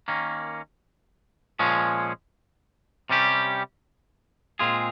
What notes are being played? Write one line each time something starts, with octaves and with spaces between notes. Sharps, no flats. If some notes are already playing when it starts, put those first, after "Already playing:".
D#3 A#3 C#4
A#2 F3 G#3 C#4
C3 G3 C#4 G4
A#2 G#3 C4 F4 G#4